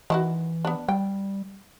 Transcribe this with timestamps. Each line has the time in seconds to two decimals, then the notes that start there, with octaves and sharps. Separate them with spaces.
0.10 D#3 E3 E4 F#4
0.65 B3 D4
0.88 G3 G5